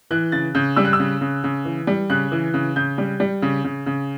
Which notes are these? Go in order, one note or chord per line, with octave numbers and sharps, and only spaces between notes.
E3 F#6
C#3 A6
C#3 G6
G3 E6
F#6
E6
C#3
C#3
C#3
E3
G3
C#3 F#6
E3
C#3
C#3 G6
G3
G3
C#3
C#3
C#3